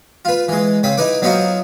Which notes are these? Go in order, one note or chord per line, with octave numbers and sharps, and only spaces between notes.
F4 B4
E3 G#3
C#3 C4 B5
D#4 E4 B4 D6
F#3 B3 D#4 F4 F#4 C5